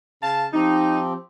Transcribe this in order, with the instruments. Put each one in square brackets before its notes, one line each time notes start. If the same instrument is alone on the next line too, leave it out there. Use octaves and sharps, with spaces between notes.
[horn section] C#3 F5 A5
[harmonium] F3 C4 G4 [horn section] D#4